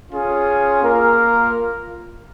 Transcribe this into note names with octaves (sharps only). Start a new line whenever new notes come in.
C#4 F4 G#4
A#3 F4 A#4